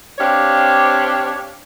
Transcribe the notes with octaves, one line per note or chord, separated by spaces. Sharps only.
C4 D4 G4 C#5 F5